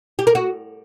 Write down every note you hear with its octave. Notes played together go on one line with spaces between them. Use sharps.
G4
A#4
F#4